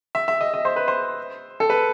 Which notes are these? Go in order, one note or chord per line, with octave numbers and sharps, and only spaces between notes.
E5
E5
D#5
D#5
C5
B4
C5
A4
B4